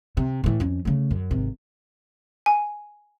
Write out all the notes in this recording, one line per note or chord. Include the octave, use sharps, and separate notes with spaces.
C3
A2 E3
F2 C#4
C#3 A3
F#2
G#1 C3
G#5